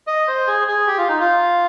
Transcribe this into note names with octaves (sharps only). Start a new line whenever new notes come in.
D#5
C5
G#4
G#4
G4
F4
D#4
F4